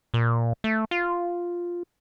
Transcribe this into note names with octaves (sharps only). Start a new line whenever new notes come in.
A#2
A3
F4